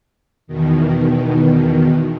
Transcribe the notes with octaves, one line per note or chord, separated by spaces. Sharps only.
E2 B2 D#3